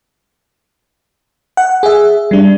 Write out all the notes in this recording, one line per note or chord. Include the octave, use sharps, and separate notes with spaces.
F#5
G#4 E5
G3 D4